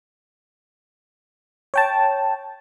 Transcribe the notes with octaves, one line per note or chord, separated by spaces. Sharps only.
C#5 G5 A5